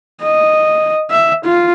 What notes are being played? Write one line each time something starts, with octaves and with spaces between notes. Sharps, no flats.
D#5
E5
F4